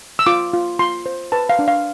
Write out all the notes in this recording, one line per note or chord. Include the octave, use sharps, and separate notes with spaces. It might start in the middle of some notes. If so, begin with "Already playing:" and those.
E6
F4 D6
F4
F4 C6
C5
B4 A5
F5
D4
F5